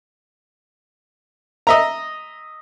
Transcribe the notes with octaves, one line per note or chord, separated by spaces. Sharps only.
D#5 E5 A#5